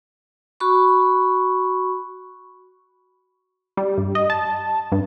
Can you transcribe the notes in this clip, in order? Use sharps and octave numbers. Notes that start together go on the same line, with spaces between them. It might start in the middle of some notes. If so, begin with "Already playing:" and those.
F#4 B5 C#6
G3
G2
D#5
A5
G2